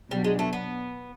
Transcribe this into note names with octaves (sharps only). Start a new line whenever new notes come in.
B2 F#3 G3 B3 D4
G#3
A3
B3